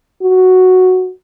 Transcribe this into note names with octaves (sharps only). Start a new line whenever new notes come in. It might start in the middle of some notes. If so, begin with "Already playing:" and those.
F#4